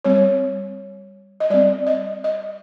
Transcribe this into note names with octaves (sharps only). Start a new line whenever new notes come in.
G3 C4 C#5
D#5
G3 C4 D5
D#5
D#5